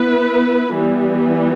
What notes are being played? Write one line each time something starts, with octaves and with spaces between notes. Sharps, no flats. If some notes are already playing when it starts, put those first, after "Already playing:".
Already playing: B3 E4 B4
E3 G3 B3